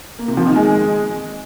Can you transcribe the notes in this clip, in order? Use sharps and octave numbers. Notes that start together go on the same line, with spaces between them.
A#3
C3
F3
D#3
G#3